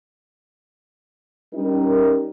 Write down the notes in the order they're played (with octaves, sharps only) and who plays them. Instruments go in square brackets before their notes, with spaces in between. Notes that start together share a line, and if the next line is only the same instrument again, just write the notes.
[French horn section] G3 C#4 D#4 A#4